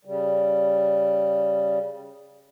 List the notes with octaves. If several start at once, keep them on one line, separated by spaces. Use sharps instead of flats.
C#3 G3